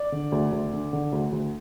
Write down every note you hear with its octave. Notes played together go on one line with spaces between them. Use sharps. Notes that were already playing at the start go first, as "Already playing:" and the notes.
Already playing: D5
D3
D2
D2
D3
D3
D2
D2